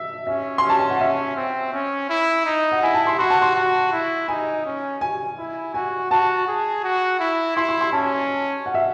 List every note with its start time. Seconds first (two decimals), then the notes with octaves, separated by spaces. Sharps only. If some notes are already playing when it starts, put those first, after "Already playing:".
Already playing: E5
0.27 C#4 E5
0.58 C#4 C6
0.69 A5
0.79 G#5
0.90 F#5
1.00 C#4 E5
1.36 C4
1.73 C#4
2.10 E4
2.46 D#4
2.72 F#5
2.82 E4 G#5
2.94 A5
3.07 C6
3.19 F#4 C6
3.30 A5
3.42 C6
3.56 F#4
3.92 E4
4.28 D#4 G#5
4.66 C#4
5.01 G#5
5.38 E4
5.74 F#4 G#5
6.11 F#4 A5
6.48 G#4
6.84 F#4
7.20 E4
7.56 E4 C6
7.69 C6
7.81 C6
7.93 C#4 A5
8.66 F#5
8.74 E5